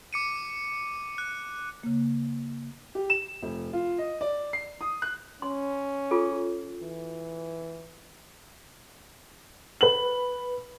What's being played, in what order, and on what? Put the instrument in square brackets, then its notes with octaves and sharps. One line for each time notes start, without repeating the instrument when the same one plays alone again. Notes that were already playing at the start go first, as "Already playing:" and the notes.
[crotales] D6 C#7 D#7
F#6
[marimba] C#3 A#3
[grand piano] G4
E7
F1
F4
D#5
D5
C7
D#6
F#6
[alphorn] C#4 [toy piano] C6
[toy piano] F4 G#4 A4
[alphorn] E3
[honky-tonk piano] B4 F#7